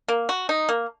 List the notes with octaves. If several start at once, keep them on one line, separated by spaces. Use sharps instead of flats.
A#3
F#4
D#4
A#3